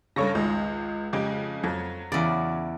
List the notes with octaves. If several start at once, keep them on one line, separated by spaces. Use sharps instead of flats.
G2 C#3 A4 C#5 C#6 A#6
G#1 C#2
F2 C#3 G#3 G4
F2 F#3
E2 C#3 E3 D5